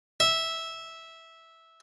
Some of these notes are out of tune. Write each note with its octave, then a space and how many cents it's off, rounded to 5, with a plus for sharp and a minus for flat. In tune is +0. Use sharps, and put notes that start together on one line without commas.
E5 -10